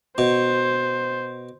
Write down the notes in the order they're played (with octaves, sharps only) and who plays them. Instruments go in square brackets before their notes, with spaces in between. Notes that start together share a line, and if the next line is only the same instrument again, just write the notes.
[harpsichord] B2 [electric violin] C5